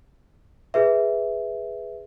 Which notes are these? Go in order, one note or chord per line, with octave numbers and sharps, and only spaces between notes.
G#4 B4 E5